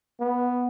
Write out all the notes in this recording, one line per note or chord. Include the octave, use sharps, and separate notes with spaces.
B3